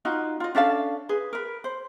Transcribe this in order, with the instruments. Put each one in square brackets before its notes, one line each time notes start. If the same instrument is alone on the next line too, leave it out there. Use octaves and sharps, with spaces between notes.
[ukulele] D#4 F4 F#4
F4 D#5
C#4 D4 A4 F5
G#4 B4
A#4 B4
C5